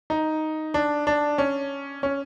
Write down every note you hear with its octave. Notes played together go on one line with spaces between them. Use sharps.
D#4
D4
D4
C#4
C#4